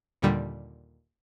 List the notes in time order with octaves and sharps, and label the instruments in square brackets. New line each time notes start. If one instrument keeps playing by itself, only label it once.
[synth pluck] D#2 A#2 D3 G3